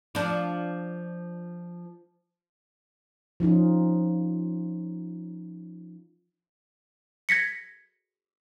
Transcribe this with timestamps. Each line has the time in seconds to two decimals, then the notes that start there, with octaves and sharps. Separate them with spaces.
0.15 F3 D4
3.40 F3 C#4 D#4 F4
7.29 G#6 A#6 B6 C#7